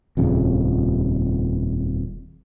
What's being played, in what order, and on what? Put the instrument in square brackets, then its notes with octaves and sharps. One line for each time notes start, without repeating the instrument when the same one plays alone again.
[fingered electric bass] D#1 F2 C#3